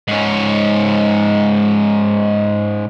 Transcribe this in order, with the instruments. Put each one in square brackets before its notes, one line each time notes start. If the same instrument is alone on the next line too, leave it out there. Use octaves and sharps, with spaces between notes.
[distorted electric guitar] G#2 C#4